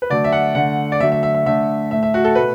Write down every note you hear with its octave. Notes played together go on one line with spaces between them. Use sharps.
B4
D3 F#3 A3 D5
E5
F#5
D3 A3 F#5
D5
D3 F#3 A3 E5
E5
E5
E5
D3 A3 E5
A2 A3 E5
E5
F#4
A4
B2 A3 B4